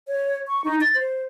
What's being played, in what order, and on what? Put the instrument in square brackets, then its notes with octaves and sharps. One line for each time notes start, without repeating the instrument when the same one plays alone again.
[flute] C#5
C#6
D#4
A6
C5